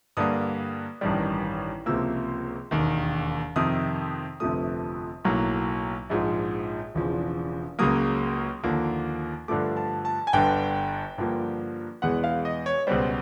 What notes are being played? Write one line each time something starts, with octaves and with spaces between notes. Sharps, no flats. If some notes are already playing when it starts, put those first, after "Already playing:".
G2 D3 G3 A#3 D#6
A1 G2 D#3 G3
C#2 C3 F3 A#3 E6
E1 D#2 D#3
F2 C3 D#3 D#6
G1 F2 C3 F3 A3 D#6
B1 A2 F#3 A#3
A#1 G#2 F3
E1 E2 C#3 F3
C#2 C#3 F#3 A#3 D#6
D#2 D3 F3 A#3
G2 D3 F3 A3 D6
A5
A5
G#5
G1 G2 D3 G5
G2 D3 F3 A#3
E2 B2 G#3 B3 F#5
F5
D#5
C#5
C#2 B2 G3 C5